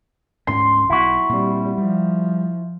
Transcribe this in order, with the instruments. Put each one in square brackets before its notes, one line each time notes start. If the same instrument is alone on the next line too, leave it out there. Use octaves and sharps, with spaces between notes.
[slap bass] D2 G#2 C#4 [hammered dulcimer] C6
[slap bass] B1 [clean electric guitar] E4 F#4
[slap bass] A#2 C4 [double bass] G3
[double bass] F3 [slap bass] G3